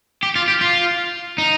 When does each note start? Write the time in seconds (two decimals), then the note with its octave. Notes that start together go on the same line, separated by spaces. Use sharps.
0.23 G4
0.36 F4
0.48 G4
0.61 F4
1.38 D#4